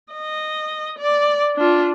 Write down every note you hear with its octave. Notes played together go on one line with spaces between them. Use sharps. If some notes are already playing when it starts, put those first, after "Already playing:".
D#5
D5
D4 F4